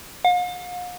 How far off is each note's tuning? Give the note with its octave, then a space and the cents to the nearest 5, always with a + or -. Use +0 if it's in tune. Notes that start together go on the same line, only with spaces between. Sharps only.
F5 +45